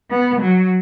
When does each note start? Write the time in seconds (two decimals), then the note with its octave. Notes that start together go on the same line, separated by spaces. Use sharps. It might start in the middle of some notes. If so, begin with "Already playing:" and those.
0.10 B3
0.41 F#3